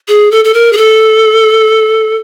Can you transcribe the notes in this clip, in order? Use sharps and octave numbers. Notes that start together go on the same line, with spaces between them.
G#4
A4
A4
A#4
G#4
A4